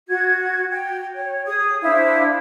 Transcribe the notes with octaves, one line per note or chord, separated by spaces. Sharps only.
F#4 G#6
G5
C#5
G#4 D#6
D4 E4 C5 F5